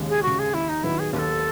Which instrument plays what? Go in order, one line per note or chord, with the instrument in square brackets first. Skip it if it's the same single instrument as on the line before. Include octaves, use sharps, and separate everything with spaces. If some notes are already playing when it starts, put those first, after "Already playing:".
Already playing: [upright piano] D#2 C#3 G#3
[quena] G#4
[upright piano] C#3 G#3 [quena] F#4
[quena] G#4
[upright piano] D#2 [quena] E4
[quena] D#4
[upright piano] D#3 F#3 B3 [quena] E4
[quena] G#4
[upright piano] D#2 [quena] B4
[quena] A4